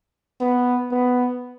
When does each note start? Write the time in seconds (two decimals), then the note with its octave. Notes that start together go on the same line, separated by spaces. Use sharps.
0.41 B3
0.91 B3